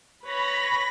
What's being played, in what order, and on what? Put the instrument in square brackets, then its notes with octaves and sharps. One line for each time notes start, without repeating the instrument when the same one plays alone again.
[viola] B4 C#5 [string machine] B5 A#6